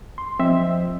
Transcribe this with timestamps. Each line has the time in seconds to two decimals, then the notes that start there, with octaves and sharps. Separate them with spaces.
0.18 C6
0.39 F3 C4 C5 D#5 E5